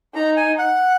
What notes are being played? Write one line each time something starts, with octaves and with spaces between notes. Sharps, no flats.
D#4 A#5
G#5
F#5